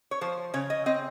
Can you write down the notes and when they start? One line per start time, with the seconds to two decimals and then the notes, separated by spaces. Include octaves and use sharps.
0.11 C#5
0.21 F3 C5
0.54 C#3 C#5
0.70 D#5
0.86 C4 D#5